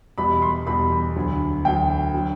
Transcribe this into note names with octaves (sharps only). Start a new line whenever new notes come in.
E2 B2 G3 B5
C6
E2 B2 G3 B5
D2 D3 F#3
D2 D3 F#3 G5
D3 F#3